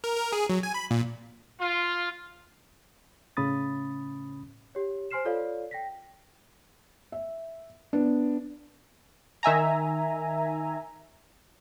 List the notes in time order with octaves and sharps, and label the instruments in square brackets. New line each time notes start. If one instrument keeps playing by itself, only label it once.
[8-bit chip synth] A#4
A#4
G#4
F#3
G#5
B5
A#2
[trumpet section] F4
[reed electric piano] A2 C#3 C#4 B5 D#6 A6
[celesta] G4 C#5
C5 G#5 C6 F6 C7 E7
F4 A4 C#5 D5 F5
G5 A#6 B6
[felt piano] E5
B3 D4
[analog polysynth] D#3 E5 G#5 A#5